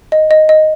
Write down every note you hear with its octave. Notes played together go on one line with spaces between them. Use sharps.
D#5
D#5
D#5